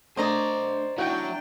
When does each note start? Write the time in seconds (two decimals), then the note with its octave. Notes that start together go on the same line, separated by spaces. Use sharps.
0.17 A3 D4 C5 D5 D#5 A#5 D#6
0.98 F#3 D4 E4 F#4 G5